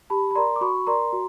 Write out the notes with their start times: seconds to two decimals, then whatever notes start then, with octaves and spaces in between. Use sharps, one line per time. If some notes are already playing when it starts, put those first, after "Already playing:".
0.10 G4 A5 B5
0.31 B5
0.35 A#4 D5 A#5 C6
0.56 D6
0.61 F#4 B5 C#6
0.87 A#4 D5 A#5 C6
1.13 F#4